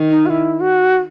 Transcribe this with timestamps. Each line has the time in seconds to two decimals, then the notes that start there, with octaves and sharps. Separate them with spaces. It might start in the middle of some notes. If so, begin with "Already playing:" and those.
Already playing: D#3
0.09 D#4
0.26 F#4
0.30 E4
0.60 F#4